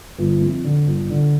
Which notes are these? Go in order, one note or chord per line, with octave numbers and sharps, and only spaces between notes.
G1
F2
D3
G1
D3